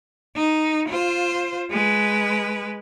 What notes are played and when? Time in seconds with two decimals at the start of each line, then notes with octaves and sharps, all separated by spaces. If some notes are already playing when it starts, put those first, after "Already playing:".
0.36 D#4
0.89 F4 C5
1.71 G#3 B4